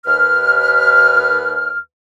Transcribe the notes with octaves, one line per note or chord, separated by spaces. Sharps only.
D#2 B4 F6